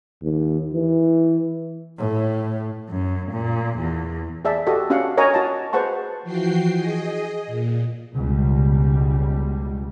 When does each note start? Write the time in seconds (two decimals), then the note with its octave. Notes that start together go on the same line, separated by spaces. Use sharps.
0.22 D#2
0.74 E3
1.98 A2
2.89 F#2
3.32 A#2
3.79 E2
4.45 G#4 D5 E5 A5
4.67 F#4 G4 A4 D#5
4.90 C#4 D4 F#4 F5 F#5
5.17 A#4 C#5 D#5 G#5 A#5
5.34 F#4 D#5 A5
5.73 G#4 B4 C5 F#5 A5 C#6
6.23 E3 F3 F#4 G5 C7
6.73 G#4 D#5
7.46 A#2
8.14 C#2 B2 G3